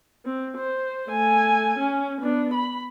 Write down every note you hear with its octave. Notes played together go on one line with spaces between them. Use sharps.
C4
C5
A3 G#5
C#4
B3 D4
B5